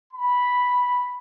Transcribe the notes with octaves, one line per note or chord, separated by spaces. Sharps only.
B5